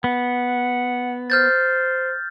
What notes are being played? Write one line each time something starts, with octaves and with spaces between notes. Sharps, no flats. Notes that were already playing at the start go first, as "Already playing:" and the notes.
B3 F#5
C5 F6 G6 A6